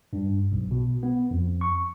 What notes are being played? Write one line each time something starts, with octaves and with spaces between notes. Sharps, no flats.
G2
B1
B2
B3
F2
C#6